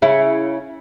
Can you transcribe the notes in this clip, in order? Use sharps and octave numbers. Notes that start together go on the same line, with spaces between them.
C#3 E4